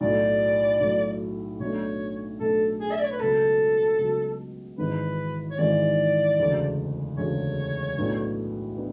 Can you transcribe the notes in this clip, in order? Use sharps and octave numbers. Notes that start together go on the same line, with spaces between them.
B1 A2 F#3 D5
B1 A2 F#3
B1 B2 A3 D4 C#5
B1 B2 A3 D4 A4
G#4
E5
D5
C#5
B4
C#2 B2 F#3 A4
C#2 B2 F#3
G#1 G#2 E3 B4
C#5
G#1 G#2 E3 D5
E1 D2 C#3
E1 D2 C#3 C#5
B1 A2 F#3 B3 D4
B3 D4